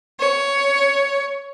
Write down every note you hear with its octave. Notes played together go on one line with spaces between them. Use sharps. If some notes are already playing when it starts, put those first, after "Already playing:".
C#5